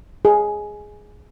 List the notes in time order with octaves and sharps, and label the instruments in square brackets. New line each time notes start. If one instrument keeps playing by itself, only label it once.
[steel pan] G#4